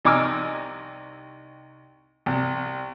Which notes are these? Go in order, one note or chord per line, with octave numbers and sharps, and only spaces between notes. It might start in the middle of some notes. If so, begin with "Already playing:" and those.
C2 D#4 G#5 D6 E6 F6
C2